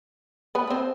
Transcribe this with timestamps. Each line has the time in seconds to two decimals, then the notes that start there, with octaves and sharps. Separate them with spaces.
0.55 B3 B4
0.67 B4
0.70 C4 C5